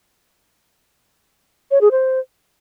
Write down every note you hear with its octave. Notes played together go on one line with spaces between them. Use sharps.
C#5
G#4
C5